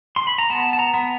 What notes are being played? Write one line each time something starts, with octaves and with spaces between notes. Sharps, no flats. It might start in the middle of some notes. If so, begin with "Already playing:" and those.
C6
B5
A#5
B3 A5
A5
A#5
B3